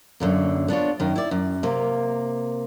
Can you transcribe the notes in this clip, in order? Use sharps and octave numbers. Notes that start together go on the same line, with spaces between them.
F#2 D3 A#3
B3 D4 F4 C#5
F#2 D#3
E4 D5
F#2
C3 A#3